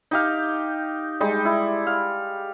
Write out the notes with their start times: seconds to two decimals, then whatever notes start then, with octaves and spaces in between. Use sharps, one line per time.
0.11 D#4 G4 F5
1.20 G3 G#3 D#4
1.45 E4
1.87 F5